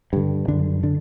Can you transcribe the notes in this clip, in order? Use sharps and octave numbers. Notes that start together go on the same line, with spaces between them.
G2 D3
F#2 D3 D4
D3 D4